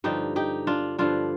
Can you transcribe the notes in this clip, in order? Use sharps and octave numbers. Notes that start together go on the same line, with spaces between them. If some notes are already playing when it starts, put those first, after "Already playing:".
G2 D3 F3 D#4 G4
D#4 G4
D4 F4
G2 D3 F3 D4 F4